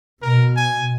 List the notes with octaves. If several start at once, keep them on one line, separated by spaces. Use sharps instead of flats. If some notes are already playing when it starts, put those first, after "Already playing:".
B2 A#4
G#5